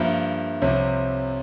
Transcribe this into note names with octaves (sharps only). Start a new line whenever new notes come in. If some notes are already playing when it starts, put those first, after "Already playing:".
Already playing: G2 F3 A#3 E5
C2 C3 F3 C4 C#5